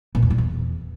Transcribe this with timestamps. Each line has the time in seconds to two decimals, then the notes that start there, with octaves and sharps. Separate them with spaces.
0.15 A#2
0.23 E2
0.30 A#2
0.38 E2